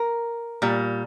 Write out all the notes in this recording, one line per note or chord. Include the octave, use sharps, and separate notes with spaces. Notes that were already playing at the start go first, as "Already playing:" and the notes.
Already playing: A#4
A#2 G3